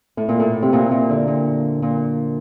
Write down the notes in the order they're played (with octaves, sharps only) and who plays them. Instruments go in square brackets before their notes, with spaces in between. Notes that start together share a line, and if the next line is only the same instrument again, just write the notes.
[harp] A2
A#2
A2
C3
A#2
A#2
D3
A#2
A#2